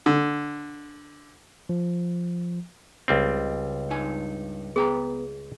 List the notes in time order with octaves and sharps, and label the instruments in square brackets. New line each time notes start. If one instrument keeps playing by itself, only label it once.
[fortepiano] D3
[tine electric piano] F3
[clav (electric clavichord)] C#2 G3 C4
[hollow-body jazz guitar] G2 D#4 G#5
[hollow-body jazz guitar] B3 G5 A#5 [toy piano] G#4